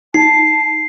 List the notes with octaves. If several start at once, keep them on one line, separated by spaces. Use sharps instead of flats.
D#4 A5 C7